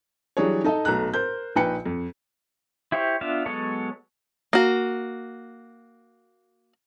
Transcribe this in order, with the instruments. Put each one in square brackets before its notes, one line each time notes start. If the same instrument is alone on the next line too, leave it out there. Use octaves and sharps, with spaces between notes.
[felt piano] E3 F#3 G3 D4 G#4 C#5
D#4 A4 D#5
B1 A3 A#5 F#6
A#4 C5 G6
A#1 D#4 B4 G5 C#7
F2
[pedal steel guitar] E4 G4 C5 C#5
B3 D4 F4 E5 F5
F#3 G#3 B3 A4 C#5
[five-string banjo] A#3 F#4